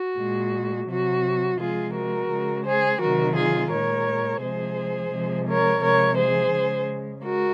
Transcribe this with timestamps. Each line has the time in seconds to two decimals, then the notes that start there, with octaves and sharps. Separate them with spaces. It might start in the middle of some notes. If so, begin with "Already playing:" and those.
Already playing: F#4
0.18 A#2 G#3
0.89 C3 F#3 F#4
1.60 C3 F3 G#3 F4 G#4
1.94 F#4 A#4
2.30 C#3 G#3
2.65 G#4 C5
3.00 C3 D#3 F#3 F#4 A#4
3.36 F4 G#4
3.71 A#2 G#3 A#4 C#5
4.41 C3 F3 G#3 G#4 C5
5.11 C3 F3 G#3
5.47 A#4 C#5
5.82 C3 F3 G#3 A#4 C#5
6.18 G#4 C5
6.53 C#3 G#3
7.23 G#3 F#4 A#4